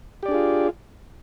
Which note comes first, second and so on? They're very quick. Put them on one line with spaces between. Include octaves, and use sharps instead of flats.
G4 D5 D4 G#4 F4